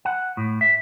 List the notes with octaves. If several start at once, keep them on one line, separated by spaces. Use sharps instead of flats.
F#5
A2
E5